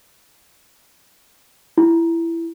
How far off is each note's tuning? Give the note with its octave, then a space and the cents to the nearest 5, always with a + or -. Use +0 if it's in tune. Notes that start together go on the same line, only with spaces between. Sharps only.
E4 +15